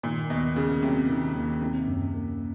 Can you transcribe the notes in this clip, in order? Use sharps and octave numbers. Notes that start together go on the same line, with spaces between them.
A#2 D#3
D#2 B2
C#3 A#3
C3 F#3
D#3
D#2
C3 D#3
F#2
A#3